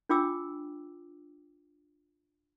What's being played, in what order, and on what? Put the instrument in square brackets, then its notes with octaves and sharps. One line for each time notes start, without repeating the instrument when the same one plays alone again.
[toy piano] D4 F4 G5 D6 E6